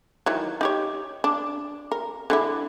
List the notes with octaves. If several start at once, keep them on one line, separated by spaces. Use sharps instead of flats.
D#3 E3 F#3
D#4 G4 C#5
D4
A#4
D3 G#3 E4